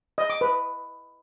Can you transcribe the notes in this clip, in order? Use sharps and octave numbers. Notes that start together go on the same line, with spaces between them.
D#5
D6
B4